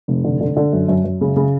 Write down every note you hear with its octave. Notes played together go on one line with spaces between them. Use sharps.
F1
D3
D3
D3
F#2
F#2
F#2
C#3
C#3